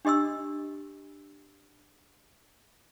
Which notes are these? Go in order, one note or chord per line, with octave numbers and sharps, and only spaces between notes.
D4 G4 D#5 C6 E6